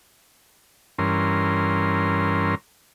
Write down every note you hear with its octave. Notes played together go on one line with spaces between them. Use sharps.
G2 E3 C#4 A#4 C6